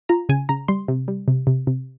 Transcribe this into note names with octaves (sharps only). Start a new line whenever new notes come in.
F4 A#5
C#3 G#5
C#3 A#5
G3 C6
C3
G3
C3
C3
C3